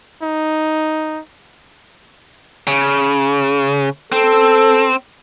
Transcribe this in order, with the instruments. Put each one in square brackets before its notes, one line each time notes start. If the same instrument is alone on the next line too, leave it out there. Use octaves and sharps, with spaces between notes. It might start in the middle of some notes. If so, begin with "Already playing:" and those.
[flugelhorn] D#4
[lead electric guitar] C#3
[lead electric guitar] C4 [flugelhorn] A4